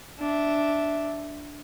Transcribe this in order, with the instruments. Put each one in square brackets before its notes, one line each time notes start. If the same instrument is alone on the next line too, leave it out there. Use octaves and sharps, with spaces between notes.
[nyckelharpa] D4 E5